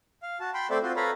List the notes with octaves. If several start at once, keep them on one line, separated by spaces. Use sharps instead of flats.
F5
F#4 A5
G5 B5 C6
A3 C4 A4 C5 D5 E5
C4 F4 F#4 C5
A4 B4 C#5 F5 A#5 B5